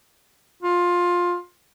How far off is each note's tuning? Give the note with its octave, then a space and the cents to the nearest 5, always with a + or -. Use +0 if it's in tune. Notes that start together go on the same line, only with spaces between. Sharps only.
F4 +15